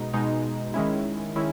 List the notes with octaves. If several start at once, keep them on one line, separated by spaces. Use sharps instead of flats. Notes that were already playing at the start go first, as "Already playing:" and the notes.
Already playing: B2 G#3 D#4
B2 G#3 D#4
D#3 G#3 C#4 E4
D#3 G#3 C#4 E4